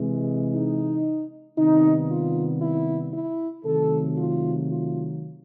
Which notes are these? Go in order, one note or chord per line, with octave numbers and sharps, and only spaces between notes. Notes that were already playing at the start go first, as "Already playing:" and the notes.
Already playing: C3 E3 G#3
D#4
C3 D#3 G3 B3 D#4
F4
E4
E4
C3 D#3 F#3 A3 A4
F4
F4